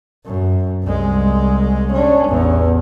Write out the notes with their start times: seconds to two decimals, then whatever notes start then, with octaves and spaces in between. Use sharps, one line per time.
0.25 F#2
0.84 C2 G#3
1.92 C#4 D4
2.28 A1 E2